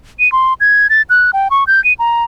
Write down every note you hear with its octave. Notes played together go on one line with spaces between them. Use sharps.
D#7
C6
G#6
A6
F#6
G5
C#6
G6
D#7
A#5